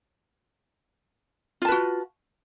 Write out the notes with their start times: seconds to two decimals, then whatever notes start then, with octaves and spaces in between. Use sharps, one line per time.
1.62 F4
1.65 A5
1.68 B4
1.72 F#4